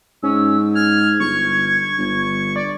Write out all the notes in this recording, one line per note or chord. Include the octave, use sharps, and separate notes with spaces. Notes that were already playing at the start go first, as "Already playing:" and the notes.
G#2 C#4 E6
F6 G#6
G1 C#6
G1
D5